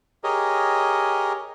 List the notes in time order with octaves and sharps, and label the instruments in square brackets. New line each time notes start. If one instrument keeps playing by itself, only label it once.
[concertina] G4 G#4 A#4 C#5 D#5